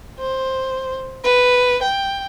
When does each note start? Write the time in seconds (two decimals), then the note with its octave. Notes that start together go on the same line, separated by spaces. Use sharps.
0.19 C5
1.24 B4
1.82 G5